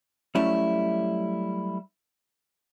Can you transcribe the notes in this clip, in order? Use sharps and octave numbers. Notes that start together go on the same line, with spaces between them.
F#3 G3 A3 C#4 E4